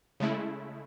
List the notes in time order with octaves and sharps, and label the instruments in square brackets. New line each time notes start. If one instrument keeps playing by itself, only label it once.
[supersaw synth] C#3 G#3 A3 E4